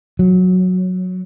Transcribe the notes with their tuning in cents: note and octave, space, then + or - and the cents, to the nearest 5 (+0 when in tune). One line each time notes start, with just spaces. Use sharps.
F#3 -10